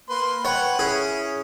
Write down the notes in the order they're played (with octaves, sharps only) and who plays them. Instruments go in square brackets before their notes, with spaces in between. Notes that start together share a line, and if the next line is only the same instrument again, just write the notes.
[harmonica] A#3 B4 C6
[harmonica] B4 F#5 G5 [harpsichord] C#5
[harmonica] C#4 E4 [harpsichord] G#4